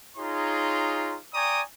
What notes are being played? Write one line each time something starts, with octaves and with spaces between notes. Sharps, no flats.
D#4 F4 G#4 C#5 A#5 C6
D5 G5 G#5 A#5 C#6 D#6